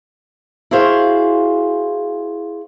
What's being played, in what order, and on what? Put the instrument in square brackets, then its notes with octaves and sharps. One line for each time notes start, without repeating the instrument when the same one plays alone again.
[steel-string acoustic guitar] E4 F#4 G#4 C5 F5